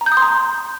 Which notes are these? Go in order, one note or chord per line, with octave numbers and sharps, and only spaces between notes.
A#5
G6
D#6
C6
A#5